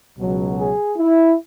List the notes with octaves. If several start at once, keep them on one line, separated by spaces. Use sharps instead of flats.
C#2 B2 F#3
G#4
E4